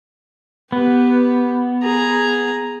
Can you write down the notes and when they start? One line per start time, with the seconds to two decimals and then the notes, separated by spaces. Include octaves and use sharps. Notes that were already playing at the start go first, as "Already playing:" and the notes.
0.72 B3 G4 B4
1.83 G#4 A#5